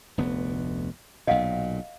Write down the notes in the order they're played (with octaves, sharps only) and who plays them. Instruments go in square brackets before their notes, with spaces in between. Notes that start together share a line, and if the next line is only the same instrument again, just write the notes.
[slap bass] F1 D2 B3
[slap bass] B1 A#2 [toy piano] D#5 F5 F#5